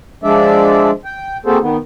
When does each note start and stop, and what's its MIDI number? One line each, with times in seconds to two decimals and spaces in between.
0.24 0.91 53
0.24 0.91 56
0.24 0.91 62
0.24 0.91 74
0.24 0.91 76
1.05 1.37 79
1.46 1.58 58
1.46 1.58 60
1.46 1.58 66
1.46 1.58 68
1.46 1.58 69
1.46 1.58 72
1.61 1.77 51
1.61 1.77 59